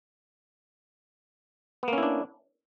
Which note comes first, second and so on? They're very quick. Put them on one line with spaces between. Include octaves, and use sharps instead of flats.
B3 A#3 C#4 E4 D4